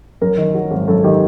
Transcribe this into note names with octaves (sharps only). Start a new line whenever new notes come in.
F#2 A#4
D#3
F#3
G#1
F#2 A4
D#3 G4